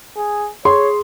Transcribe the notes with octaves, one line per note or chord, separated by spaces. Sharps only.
G#4
G#4 C#5 C6